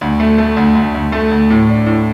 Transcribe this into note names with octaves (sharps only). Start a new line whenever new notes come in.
D2
A3
A3
D2
D2
D2
A3
D2
A2
D4
A2